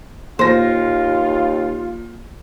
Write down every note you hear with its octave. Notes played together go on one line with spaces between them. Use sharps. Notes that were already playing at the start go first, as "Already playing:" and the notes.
D#2 A#2 F4 C5 A#6